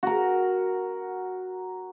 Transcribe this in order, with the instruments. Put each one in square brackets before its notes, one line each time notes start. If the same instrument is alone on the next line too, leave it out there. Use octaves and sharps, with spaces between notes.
[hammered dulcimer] F#4 A#4